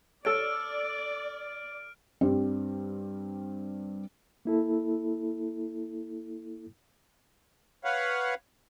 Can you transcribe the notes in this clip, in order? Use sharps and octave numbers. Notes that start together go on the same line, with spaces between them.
A4 C#5 D5 F6 D7
G2 G3 C4
A#3 E4 A4
B4 C#5 F5 F#5